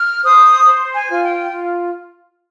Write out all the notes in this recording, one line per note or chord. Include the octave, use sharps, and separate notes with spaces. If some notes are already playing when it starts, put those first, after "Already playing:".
Already playing: F6
C5 D#6
C5
G#5
F4
G5
F4